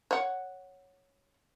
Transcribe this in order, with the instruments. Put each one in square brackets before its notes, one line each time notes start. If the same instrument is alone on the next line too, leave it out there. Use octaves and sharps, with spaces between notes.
[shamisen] C#5 F#5